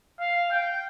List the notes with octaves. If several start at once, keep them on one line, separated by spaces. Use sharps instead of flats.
F5
G5